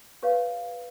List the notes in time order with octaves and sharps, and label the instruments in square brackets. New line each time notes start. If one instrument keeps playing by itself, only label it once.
[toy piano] G4 B4 C#5 F5